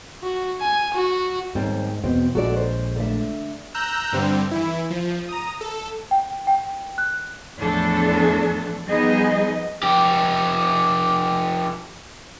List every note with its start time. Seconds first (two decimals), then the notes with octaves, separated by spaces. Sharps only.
0.23 F#4
0.61 G#5
0.94 F#4
1.55 D#2 G#2 G3 C4
2.04 E2 B2 C4
2.35 A#1 G#3 F#4 A4 D5
2.56 C5
2.96 D3 A3 E5
3.74 A#5 E6 F#6 G6
4.12 G2 D3 G3 C4
4.51 E3 E4
4.90 F3
5.29 A#5 D#6
5.61 A4
6.11 G5
6.47 G5
6.98 F#6
7.57 E2 A2 F3 A3 D4 A4
8.88 F3 G3 B3 D#4 G#4 D#5
9.83 F2 G4